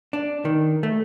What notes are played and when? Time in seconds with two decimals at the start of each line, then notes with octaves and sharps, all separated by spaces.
0.13 D4
0.45 D#3
0.83 A3